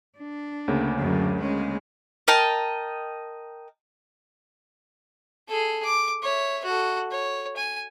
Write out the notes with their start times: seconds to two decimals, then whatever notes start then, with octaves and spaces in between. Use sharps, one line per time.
0.19 D4
0.68 D2 C#3 A#3
0.99 F#2 D3
1.38 G#3 C#4
2.28 A#4 D#5 G5 A5
5.48 G#4 A4
5.85 D6
6.23 C#5 E5
6.64 F#4 A4
7.11 C#5
7.57 G#5